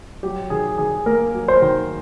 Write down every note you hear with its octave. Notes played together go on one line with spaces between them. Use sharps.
F#3 G4
D#3 G#4
D#3 G#4
A#3 A#4
F#3
C5
D#3